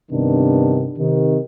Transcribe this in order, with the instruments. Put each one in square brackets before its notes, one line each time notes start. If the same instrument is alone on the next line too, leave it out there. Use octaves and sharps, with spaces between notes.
[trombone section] G2 C3 D#3 B3 D4
C3 D#3